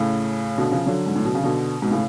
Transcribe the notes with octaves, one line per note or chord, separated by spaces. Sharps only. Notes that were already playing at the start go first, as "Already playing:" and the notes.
Already playing: A2 C#3
B2 D3
C#3 F3
D3 F#3
G#2
A2
B2
C#3
B2 D3
G#2 B2
A2 C#3